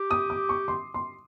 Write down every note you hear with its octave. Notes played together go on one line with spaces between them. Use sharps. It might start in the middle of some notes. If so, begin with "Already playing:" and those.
Already playing: G4
D#6
D6
C#6
C6
C6